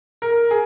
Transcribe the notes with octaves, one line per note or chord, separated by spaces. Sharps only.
A#4
G#4